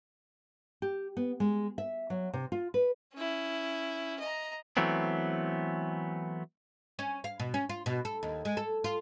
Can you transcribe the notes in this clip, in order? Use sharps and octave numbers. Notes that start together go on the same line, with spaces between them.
G4
B3
G#3
E5
F#3
C3
F4
B4
C#4 E4
D#5 A#5
E3 F#3 A3 B3 C4
C#4
F5
B2
C#4
F4
B2
A4
D#2
G#3
A4
F4